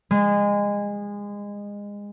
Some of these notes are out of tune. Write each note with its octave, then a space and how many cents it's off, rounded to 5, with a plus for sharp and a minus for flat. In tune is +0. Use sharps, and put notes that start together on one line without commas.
G#3 -25